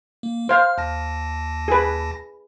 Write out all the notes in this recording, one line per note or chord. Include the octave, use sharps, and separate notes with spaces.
A#3
C5 F5 F6
D#2 A5 A#6
G#4 B4